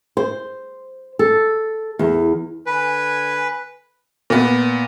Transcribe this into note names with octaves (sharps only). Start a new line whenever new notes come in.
C5
A4
E2
D3 B4 G#5
A#2 B3